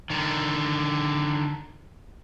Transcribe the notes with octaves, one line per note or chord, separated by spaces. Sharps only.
D3 D#3